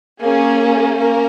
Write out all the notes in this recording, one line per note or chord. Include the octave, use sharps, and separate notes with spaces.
A#3 C#4 G#4
A#3 C#4 A#4